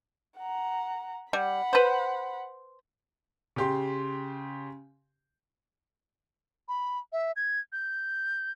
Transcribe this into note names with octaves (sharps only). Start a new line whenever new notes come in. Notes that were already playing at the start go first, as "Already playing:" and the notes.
F#5 A#5
G3 F#5 B5
B4 C5
C#3 G4 C6
B5
E5
G#6
G6